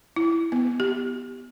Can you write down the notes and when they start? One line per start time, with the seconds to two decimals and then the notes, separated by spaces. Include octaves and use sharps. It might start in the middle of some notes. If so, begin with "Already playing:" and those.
0.16 E4
0.52 B3
0.80 G4